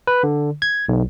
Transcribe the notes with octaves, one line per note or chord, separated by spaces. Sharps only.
B4
D3
G#6
B1